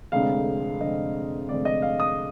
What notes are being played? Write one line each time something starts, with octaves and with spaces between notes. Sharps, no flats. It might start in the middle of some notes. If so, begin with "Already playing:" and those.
F1 F2 D3 G#3 C4 F5
F1 F2 D3 G#3 C4 D#5
F1 F2 D3 G#3 C4 D5
D#5
F5
D#6